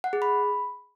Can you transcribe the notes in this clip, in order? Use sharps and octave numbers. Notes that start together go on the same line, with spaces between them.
F#5
G#4
B5